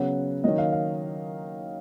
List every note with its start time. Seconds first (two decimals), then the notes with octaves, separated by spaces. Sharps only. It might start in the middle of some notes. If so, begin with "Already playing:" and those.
Already playing: C#3 F#3 B3 F#5
0.44 D#3 F#3 A#3 D#5
0.58 F5
0.72 F5